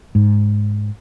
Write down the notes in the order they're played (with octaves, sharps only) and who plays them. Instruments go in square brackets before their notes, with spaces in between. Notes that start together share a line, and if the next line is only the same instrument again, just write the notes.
[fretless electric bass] G#2